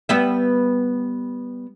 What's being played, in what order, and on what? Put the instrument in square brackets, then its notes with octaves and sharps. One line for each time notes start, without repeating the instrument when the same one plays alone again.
[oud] G3 B3 E5